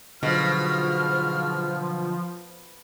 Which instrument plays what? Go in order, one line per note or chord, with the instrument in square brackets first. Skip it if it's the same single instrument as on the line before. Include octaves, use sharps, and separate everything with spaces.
[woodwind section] G#2 F#4 F6 [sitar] B2 [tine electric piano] D3 F#3 [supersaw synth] F3